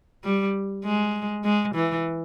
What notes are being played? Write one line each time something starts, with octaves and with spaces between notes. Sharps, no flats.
G3
G#3
G#3
E3